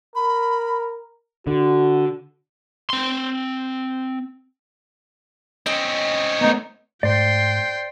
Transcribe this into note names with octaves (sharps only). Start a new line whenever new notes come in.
A#4 B5
D3 F#4
C4 C6
C4 C#4 D#5
A3 B3 D#4
G#2 A3 C5 D5 G5 C6